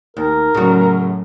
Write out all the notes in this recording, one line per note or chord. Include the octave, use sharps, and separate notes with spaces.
D#2 A#4
F#2 A2 C#3 F#4